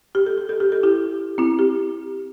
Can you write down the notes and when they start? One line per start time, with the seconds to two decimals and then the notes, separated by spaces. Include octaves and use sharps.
0.15 G4
0.26 A4
0.38 G4
0.49 A4
0.60 G4
0.72 A4
0.83 E4 G4
1.38 C4 E4
1.59 G4